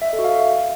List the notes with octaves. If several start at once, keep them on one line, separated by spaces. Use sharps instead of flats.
E5
D#5
A4
F#4
F5